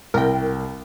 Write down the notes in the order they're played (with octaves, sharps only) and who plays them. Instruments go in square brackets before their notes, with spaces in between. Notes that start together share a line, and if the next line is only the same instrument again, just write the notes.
[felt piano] C2 [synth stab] A#4 G5